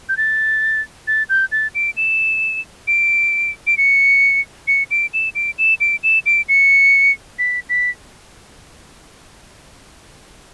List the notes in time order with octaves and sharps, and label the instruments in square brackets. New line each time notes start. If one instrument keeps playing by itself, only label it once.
[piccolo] G6
A6
A6
G6
A6
D7
E7
D7
D7
C#7
C#7
D7
E7
D7
E7
D7
E7
D7
C#7
B6
B6